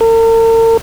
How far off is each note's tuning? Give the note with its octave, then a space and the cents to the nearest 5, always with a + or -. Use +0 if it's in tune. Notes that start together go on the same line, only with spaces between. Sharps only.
A#4 -45